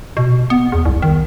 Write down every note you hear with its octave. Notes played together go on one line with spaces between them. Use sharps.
B2
B3
E2
C2
D#3